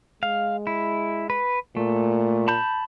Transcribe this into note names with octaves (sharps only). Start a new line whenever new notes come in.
G#3 F5
E4
B4
A#2 A3
A5 B5 G6